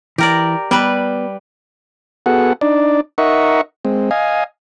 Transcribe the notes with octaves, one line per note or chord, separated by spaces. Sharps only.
E3 G4 A#4 D5
G3 B3 B4
B3 F#4 G#4 A4 F#5
D4 D#4 D5
D#4 A#4 D#5 E5 F#5 C#6
G#3 C4
D#5 F5 G#5